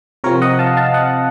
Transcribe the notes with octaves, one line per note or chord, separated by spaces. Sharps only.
C3 F3 C4 A#4 C#5
D#5 F#5
F5 A5
F5 A5
D#5 F#5